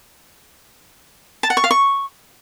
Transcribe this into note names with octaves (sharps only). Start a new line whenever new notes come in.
A5
F#5
C#6
F5
C#6